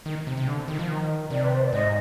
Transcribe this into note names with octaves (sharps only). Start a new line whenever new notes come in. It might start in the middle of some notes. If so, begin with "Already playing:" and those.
D#3
C3
C3
D3
D#3
F3
D#3
C3 D5
B4
C5
D5
G#2 D#5